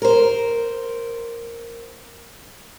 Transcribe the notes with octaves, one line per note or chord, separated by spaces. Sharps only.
A#4 C5